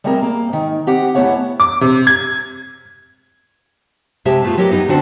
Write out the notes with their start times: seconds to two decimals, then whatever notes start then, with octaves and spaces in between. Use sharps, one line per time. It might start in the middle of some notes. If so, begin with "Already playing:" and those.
0.04 G3 A3 C4 G#4 A#4
0.22 A#3
0.49 G#2 D#3
0.87 C4 G4 F#5
1.15 F#2 A3 B3 E4 C#5 F#5
1.60 D6
1.81 C3
2.07 G#6
4.25 C3 G#3 G4 E5 A5
4.44 A3 B3 F4
4.58 F#3 G4 A#4 B4 D#5
4.71 B3 D#4 G4 D#5
4.89 D3 C4 D4 F#4 C5